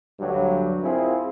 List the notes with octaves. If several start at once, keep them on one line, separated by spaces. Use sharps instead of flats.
D2 G2 F#3
C4 E4 F4 G#4 A#4